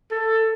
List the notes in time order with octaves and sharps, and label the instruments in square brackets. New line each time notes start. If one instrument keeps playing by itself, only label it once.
[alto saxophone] A4